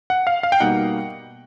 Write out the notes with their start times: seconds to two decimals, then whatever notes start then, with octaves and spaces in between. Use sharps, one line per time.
0.10 F#5
0.27 F5
0.43 F5
0.52 G5
0.60 B2 G3 A#3 D#4 F#5